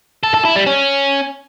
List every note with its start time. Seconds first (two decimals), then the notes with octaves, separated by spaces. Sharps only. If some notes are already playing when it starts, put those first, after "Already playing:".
0.23 A4
0.34 A4
0.45 E4
0.56 G3
0.66 C#4